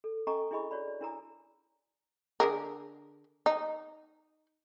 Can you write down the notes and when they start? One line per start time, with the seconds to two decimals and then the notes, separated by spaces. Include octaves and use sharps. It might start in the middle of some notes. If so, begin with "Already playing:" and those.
0.04 A4
0.27 C#4 A4 D#5 G#5 A#5 C#6
0.51 D4 E4 G#4 D#5 B5 C#6
0.71 F#4 C#5 D5 B5
0.88 D5
1.01 D4 E4 A#4 G#5 A#5 D#6
2.40 D3 G#4 A#4
3.46 D#4